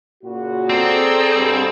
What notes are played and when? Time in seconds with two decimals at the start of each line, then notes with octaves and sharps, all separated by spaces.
0.24 A#2 C#3 F#4
0.69 C4 G#4 A4 D5 A#5 E6
1.34 G2 B2